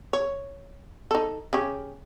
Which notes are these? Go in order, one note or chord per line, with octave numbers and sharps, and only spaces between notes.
C#5
D#4 A4
C#3 C#4 G4